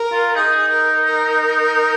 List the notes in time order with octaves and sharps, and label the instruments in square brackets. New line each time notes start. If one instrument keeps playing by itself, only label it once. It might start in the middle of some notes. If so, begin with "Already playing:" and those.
Already playing: [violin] A#4
[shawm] F4
[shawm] D#4 [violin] G#4
[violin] A#4
A#4